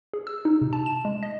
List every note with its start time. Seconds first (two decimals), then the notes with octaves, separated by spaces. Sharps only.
0.13 G#4
0.27 E6
0.45 D#4
0.61 C3
0.73 A5
0.86 E7
1.05 G#3
1.23 D#5